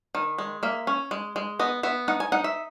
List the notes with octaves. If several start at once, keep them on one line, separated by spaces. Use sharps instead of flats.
D#3
G#3
A#3 E5
C#4
G#3
G#3
B3 D#5
B3 E5
D#4 F#5
G#5
D#4 F#5
E5